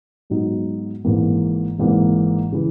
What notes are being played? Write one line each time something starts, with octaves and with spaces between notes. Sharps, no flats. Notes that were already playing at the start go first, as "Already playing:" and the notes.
G#2 F#3 B3 D#4
G#1 G#2 E3 A#3
G#1 G#2 E3 A#3
C#3 E3